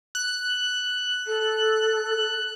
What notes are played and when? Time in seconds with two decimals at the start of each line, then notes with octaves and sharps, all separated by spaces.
0.15 F#6
1.27 A4